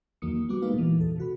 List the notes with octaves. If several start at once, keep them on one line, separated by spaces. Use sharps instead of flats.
E2 D#3 F#3 A#3 D#6 C#7
G3 B3 F#4 D6
G#3 A#3 D#4 B4 F5
A#2 E3
E2 A4
C3 F#4 B5